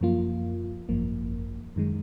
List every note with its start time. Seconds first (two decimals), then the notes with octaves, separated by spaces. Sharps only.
0.01 F#2 F3 A#3 F4
0.89 G#1 F#2 F3 A#3
1.76 F#2 D#3 G#3